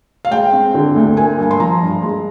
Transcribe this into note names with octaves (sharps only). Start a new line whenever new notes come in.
F5
G#3 G5
C4
D3
D2
A#3 G#5
G2
C6
F3 A#5
G2
G#3